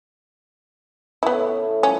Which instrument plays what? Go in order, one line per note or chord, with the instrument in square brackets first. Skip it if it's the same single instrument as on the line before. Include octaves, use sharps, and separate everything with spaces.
[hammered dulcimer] A2 C#3 A3 [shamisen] B3 E4
[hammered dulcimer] F3 G3 [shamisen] C#4